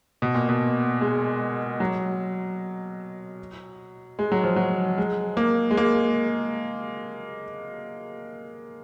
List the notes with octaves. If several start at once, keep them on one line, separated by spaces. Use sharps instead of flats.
B2
A#2
B2
G#3
F#3
G#3
F#3
F3
F#3
G#3
A#3
G#3
A#3